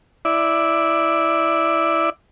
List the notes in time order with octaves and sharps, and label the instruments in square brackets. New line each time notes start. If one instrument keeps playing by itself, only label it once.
[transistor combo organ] E4 D5